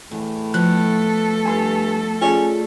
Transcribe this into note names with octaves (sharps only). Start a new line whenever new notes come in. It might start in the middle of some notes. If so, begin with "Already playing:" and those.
E2 A2
F3 A3 B3 A4 F#6
G2 G#5 C6
C#4 F4 G#4 D5